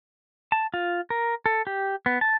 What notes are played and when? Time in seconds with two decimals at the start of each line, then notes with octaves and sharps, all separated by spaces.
0.52 A5
0.74 F4
1.10 A#4
1.46 A4
1.67 G4
2.06 B3
2.21 A5